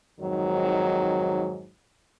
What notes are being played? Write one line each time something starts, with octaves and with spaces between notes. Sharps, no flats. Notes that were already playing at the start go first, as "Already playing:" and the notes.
F2 G#2 D#3 F#3